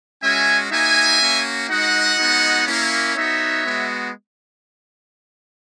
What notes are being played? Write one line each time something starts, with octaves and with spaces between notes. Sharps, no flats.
G#3 C#4 F#4 E5 G#5
A#3 D#4 F#4 E5 G#5
A#3 C#4 F#4
G#3 D#4 F#4 D#5 F#5
G#3 B3 D#4 F#4
A#3 C#4 E4
B3 D#4 F#4 C#5 E5
G#3 B3 F#4